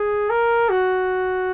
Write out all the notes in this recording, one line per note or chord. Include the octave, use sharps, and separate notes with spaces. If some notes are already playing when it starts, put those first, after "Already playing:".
Already playing: G#4
A#4
F#4